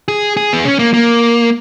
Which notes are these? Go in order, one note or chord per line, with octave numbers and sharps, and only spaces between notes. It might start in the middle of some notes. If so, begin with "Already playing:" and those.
G#4
G#4
B3
C#4
A#3
A#3